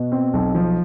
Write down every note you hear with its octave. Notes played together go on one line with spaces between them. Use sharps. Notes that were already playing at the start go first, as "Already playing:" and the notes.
Already playing: B2
C4
B1
F3